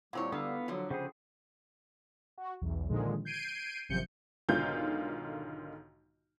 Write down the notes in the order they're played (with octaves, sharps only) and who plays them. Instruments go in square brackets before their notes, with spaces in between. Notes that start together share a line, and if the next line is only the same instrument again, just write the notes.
[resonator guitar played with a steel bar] A#2 C4 C#5 [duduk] G3 [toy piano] E4 F4 F#5
[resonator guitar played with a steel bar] D3 [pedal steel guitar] B3 F5 [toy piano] A#5 D#6
[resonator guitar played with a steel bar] D3 F3 [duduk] F#3 [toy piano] F#4 A4
[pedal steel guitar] C#3 G#4 [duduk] C5 [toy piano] F#5 G5 B5
[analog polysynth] F#4
B1 E2
A#2 D3 D#3 F3 G#3
G6 G#6 C7 D7 D#7
G#1 F#2 C3 F3 G6 C#7
[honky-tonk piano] B1 G#2 D3 D#3 F4 G6